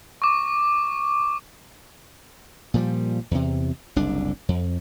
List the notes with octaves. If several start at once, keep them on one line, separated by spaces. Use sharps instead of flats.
C#6 D6
A#2 F3 G3
E2 C3
F#1 C2 D4
F2